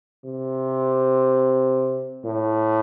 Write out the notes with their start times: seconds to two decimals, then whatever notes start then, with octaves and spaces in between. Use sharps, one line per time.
0.25 C3
2.25 A2